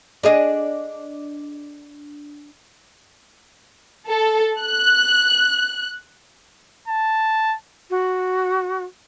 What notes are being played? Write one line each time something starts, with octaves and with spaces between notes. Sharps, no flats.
D4 G#4 D#5
A4
F#6
A5
F#4